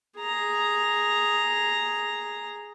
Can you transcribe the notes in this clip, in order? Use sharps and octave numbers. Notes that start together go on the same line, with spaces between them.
G#4 A#5